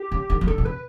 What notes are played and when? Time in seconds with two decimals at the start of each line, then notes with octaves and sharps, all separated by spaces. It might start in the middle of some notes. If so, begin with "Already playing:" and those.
Already playing: G4
0.11 C#3
0.30 D3
0.41 E3
0.47 D3 A4
0.58 B2
0.65 C#3 B4